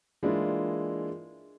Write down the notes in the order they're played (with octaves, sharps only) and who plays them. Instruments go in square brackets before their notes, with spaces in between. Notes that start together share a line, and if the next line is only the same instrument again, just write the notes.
[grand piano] E3 G#3 A#3 D4 E4 F4